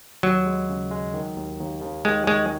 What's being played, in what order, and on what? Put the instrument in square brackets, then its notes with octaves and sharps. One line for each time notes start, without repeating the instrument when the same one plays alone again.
[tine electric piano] D#2 [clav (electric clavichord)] F#3
[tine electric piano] G#3
C#3
G#3
D#3
D#2
D#2
D#2
[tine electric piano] D#3 [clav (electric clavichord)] G#3
[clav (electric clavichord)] G#3 [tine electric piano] C#5